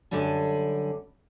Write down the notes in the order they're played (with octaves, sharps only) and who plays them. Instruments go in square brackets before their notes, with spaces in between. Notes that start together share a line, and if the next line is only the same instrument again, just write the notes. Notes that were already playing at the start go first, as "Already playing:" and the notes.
[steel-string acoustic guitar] F#2 D3 G3 D4 G#5